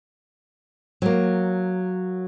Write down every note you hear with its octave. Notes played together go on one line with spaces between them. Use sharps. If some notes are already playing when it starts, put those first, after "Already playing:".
F#3 A#3